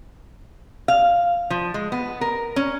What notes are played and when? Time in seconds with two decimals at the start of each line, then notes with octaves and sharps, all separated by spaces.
0.88 F5
1.50 F3
1.74 G#3
1.92 B3
2.21 A#4
2.56 C#4